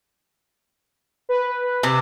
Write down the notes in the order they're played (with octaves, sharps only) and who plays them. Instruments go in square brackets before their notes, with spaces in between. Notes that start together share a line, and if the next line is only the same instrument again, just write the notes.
[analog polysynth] B4
[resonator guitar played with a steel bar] C3